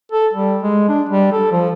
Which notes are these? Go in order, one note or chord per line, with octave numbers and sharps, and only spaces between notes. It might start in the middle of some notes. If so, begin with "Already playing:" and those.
A4
G3
G#3
D4
G3
A4
F3